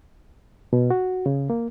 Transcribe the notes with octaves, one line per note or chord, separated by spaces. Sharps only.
B2
F#4
C#3
A#3